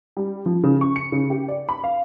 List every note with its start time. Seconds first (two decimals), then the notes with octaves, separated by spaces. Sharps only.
0.17 G3
0.46 F3
0.64 C#3
0.81 C#6
0.96 C#7
1.12 C#3
1.30 G4
1.48 D5
1.69 B5
1.84 F5